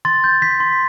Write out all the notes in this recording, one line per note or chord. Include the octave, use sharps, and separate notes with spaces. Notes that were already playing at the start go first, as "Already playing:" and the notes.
C6 A6
G6
G6 B6
C6